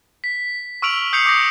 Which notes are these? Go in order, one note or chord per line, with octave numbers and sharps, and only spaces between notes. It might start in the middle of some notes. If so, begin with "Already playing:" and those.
B6
C#6 E6 F6 D7 F7 F#7
D#6 G6 C7 C#7 F7 F#7
D6 D#6 G6 A#6 C7